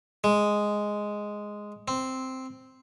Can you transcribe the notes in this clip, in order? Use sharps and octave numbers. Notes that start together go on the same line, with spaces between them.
G#3
C4